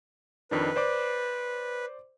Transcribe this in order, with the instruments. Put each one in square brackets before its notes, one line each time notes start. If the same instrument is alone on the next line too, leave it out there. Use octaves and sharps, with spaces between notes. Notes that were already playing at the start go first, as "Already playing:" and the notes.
[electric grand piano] F2 D#3 D4 [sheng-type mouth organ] B4
[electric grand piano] C5 D5 D6